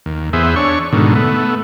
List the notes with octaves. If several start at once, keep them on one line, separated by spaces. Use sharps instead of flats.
D#2
E2 B3 G#4 C5 E5
D4 C#5 C#6
G#2 B2 D3 D#3
A3 B3